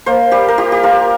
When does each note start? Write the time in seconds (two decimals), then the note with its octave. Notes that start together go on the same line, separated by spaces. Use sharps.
0.06 A#3 C5
0.31 G3 G4
0.48 A#4
0.58 F4 G4
0.72 G4
0.83 F4 A#4